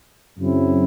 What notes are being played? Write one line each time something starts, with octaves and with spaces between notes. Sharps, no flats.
F#2 C#3 F#3 C4 E4